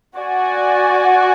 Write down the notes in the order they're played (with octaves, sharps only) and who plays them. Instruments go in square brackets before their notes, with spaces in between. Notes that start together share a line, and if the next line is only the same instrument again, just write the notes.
[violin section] F#4 D5 G#5